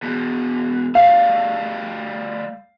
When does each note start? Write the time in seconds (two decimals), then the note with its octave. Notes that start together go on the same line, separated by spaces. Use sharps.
0.03 E2 B2
0.95 G3 A3 F5